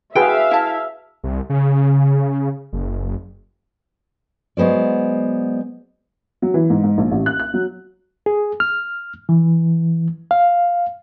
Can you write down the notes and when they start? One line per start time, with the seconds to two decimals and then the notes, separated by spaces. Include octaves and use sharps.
0.15 F#4 G#4 B4 E5 F5 G5
0.51 E4 A5
1.24 C2
1.50 C#3
2.73 F#1
4.57 F#3 G#3 B3 C5 D5
6.42 F#3
6.54 E3
6.70 G#2
6.83 G#2
6.98 A#1
7.11 A1
7.26 F#6
7.40 F#6
7.54 F#3
8.26 G#4
8.60 F6
9.29 E3
10.31 F5